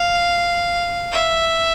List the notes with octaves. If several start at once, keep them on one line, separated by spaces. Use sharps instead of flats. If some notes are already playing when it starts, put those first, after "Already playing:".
Already playing: F5
E5